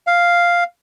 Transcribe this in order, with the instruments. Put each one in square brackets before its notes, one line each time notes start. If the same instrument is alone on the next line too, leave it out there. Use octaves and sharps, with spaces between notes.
[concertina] F5